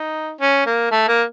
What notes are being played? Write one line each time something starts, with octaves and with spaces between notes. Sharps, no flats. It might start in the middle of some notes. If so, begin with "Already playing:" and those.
Already playing: D#4
C#4
A#3
A3
A#3